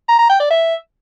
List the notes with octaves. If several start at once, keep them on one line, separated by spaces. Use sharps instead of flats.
A#5
A#5
G5
D5
E5